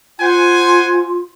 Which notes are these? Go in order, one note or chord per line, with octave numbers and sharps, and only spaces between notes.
F4 C5 F#5 G#5